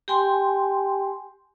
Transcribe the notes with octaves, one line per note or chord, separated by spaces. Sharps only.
G4 G5 G#5 C6